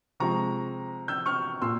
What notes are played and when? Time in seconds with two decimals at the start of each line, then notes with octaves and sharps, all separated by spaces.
0.20 C3 F3 G#3 A#5 C#6
1.08 E6 G6
1.26 C#6 F6
1.62 A#2 C6 E6